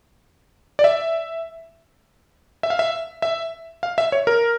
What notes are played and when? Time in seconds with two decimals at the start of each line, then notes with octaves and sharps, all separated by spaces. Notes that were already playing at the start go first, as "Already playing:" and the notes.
0.79 D5
0.84 E5
2.63 E5
2.70 F5
2.79 E5
3.22 E5
3.83 F5
3.98 E5
4.12 C#5
4.27 A#4